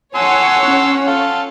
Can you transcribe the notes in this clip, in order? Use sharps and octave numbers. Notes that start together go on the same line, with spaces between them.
C#5 F#5 G#5 A5 C6 E6
C#4
F4 A4